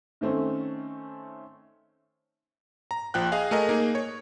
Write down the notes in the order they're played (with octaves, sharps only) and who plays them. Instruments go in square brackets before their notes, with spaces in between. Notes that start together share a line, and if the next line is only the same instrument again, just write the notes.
[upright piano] D#3 A3 C4 C#4
[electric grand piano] A#5
A#1 F3 G5 F#6
G#4 D#5 F5 G#5
A3 G#4 A#4 D#5
A#3 D#4 G#4
C#5